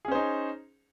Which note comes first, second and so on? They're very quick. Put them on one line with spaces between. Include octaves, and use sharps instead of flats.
G#4 C#4 C5 D#4